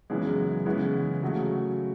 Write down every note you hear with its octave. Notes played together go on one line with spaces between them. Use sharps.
F#2 C#3 E3 G#3 B3
C#3 E3 G#3 B3
C#3 F#3 A3